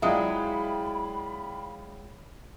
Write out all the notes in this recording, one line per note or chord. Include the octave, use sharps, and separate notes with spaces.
F#3 G#3 E4 F4 D5 E5 G5 B5